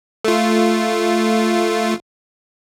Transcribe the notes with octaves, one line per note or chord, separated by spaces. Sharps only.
A3 F4